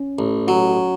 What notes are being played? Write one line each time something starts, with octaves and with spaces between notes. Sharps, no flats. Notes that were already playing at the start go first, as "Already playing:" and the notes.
Already playing: C#4
A1
F#3 F#4